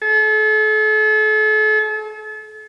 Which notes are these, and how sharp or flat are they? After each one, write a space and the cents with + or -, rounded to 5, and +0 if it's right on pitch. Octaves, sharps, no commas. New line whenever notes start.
A4 -40